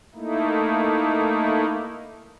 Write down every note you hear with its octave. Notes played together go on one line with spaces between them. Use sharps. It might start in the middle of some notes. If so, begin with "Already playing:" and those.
A3 A#3 D#4 E4